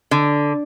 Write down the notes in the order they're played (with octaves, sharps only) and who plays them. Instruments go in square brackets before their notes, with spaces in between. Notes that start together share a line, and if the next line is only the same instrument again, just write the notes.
[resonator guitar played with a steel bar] D3